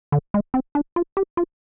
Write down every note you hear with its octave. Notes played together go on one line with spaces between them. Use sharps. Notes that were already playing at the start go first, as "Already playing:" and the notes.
D3
G#3
C4
D4
F4
G4
F4